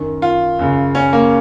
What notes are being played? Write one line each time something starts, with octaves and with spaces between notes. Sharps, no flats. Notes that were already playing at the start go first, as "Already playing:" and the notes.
Already playing: F#2 D#3
F4
F#2 C#3
C#4
A#3